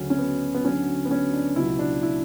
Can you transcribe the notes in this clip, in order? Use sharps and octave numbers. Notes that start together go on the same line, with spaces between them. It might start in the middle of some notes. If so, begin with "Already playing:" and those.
Already playing: D2 C#3 F#3 C#4
C#4
B3
B3
D2 D3 F#3 C#4
B3
C#4
D4
C#2 B2 F#3 E4
D4
E4